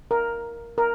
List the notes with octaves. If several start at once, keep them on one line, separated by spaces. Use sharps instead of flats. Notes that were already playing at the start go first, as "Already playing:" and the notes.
A#4
A#4